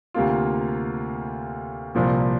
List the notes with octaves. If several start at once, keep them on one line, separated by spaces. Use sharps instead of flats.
D2 C3 A#3 F4
C2 A#2 F3 A#3